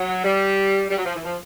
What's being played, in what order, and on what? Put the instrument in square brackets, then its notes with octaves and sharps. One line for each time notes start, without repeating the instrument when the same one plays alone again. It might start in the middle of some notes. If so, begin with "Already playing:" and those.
Already playing: [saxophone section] F#3
G3
G3
F#3
F3
E3
F3